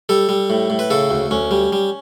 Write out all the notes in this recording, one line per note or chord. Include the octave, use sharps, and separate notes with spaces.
G3 A4
G3
A2
A2
B4
C#3 A4
D2
D2 C#4
G3
G3